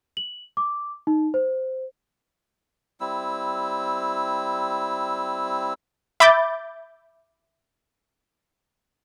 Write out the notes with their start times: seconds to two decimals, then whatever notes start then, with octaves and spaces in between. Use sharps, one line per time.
0.17 F#7
0.57 D6
1.07 D#4
1.34 C5
3.00 G3 C4 E4 E6
6.20 E5 B5 D6 G6 A6